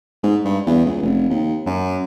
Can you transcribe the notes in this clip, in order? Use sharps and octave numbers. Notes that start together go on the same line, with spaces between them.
G#2
G2
E2
C#2
F1
D#2
F#2